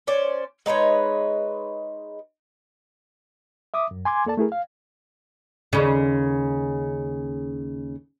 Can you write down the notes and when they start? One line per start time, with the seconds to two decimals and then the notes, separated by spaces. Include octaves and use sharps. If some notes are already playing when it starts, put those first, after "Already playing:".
0.07 C#4 C5 D5
0.66 G#3 D#4 B4 C#5
3.74 E5 D6 D#6
3.91 F#2
4.05 G#5 C6 D6 G#6
4.25 E2 A#3 A4 D5 A5
4.37 A3 E4 G#4 A#4
4.52 F5
5.73 D#2 C#3